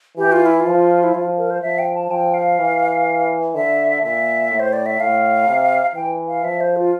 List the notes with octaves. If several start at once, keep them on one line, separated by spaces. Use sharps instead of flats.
E3 G4
F4
E4
F4
F3
E4
F3 F4
A#4
C5
F3 E5
G5
A5
F3 G5
F5
E3
D3 E5
A#2 E5
A2
C5
D5
E5
A2 F5
C3
E3 G5
F5
F3 E5
C5
F4